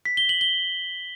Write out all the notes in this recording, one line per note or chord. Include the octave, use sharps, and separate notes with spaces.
B6
G7
F#7
G7